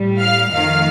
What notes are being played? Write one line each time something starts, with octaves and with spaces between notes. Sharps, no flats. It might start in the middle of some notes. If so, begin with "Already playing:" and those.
Already playing: A2 G3
F5 F6
F2 D#3 A3 F5 F6